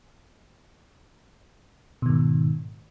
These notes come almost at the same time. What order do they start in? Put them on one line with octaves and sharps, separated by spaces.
B2 D#3 G#2